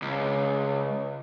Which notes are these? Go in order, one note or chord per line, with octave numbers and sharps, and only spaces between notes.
C#2